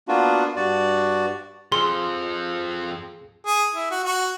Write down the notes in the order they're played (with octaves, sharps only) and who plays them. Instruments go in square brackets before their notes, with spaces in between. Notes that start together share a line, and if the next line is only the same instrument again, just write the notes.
[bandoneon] A#3 B3 D4 F4 F#4
G2 F#4 D5
[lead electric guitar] F2 F3 [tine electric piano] G#4 [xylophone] C6
[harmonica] G#4
E4
F#4
F#4